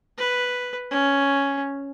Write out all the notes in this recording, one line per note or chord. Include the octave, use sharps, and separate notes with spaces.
B4
C#4